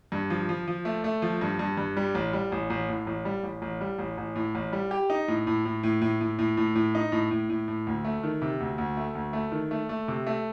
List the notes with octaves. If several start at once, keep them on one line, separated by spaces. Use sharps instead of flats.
G2
F3
F3
F3
A3
A3
F3
G2
G2
G2
G3
A1
G3
A1
A1
A2
A1
G3
A1
A1
G3
A1
A1
A2
A1
G3
G4
D#4
A2
A2
A2
A2
A2
A2
A2
A2
A2
D#4
A2
A2
A2
A2
D2
A3
D#3
C3
D2
D2
A3
D2
A3
D#3
A3
A3
C3
A3